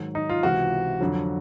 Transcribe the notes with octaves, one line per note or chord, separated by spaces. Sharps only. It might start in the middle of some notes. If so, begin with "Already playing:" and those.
Already playing: G#2 D#3 F#3
D#4
F4
C#2 C3 E3 F#4
F2 D3 F#3